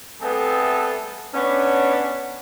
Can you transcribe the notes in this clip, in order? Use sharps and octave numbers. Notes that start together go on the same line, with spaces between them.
G3 A3 B3 C4 G#4 A4
B3 C#4 D4